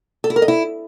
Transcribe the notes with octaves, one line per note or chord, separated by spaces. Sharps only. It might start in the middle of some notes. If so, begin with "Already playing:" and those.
A4
E4
A#4
D#5
E4